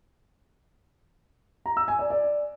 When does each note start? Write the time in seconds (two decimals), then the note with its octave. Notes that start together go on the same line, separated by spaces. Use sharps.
1.66 A#5
1.77 E6
1.88 G#5
1.99 D5
2.10 D5